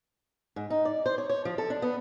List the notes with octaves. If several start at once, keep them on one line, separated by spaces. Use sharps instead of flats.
G#2
D#4
D5
C5
C#5
C#5
F3
A4
D4
B3